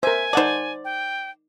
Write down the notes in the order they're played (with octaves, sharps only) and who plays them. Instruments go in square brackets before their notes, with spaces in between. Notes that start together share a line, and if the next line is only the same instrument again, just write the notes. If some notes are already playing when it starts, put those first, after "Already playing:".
[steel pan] A#4 C5 [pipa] E5 [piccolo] G#5
[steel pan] D#4 F#5 A5 [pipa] C5 D5
[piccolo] G5